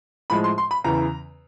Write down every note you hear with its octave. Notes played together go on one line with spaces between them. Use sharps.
A2 F3 G#3 B5
C6
C6
B5
E2 C#3 E3 A#5